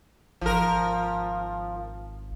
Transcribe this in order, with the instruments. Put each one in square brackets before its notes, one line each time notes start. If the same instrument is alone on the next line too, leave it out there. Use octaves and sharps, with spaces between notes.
[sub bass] G#1 [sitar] F3 A#4